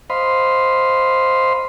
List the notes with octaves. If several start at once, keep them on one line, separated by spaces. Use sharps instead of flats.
C5 D#5 F5 B5 C6